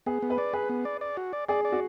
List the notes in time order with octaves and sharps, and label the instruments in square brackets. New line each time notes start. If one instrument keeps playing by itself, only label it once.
[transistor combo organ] B3 [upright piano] G#4
[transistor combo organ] B3
[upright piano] B4
[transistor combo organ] D5
[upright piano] G#4 [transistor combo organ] B4
[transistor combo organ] B3
D5
D5
F#4
D5
[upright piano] G#4 [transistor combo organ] D5
[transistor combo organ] D5
[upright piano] F#4